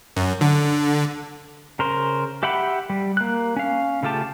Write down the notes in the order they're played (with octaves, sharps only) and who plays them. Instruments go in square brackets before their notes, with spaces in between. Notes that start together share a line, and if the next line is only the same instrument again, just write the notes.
[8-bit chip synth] F#2
D3
[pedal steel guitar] C#3 A#4 C5
G4 E5 F#5 G5 B5
G3
A#3 F#6
C#4 F5
C#3 A3 F4 G4 A5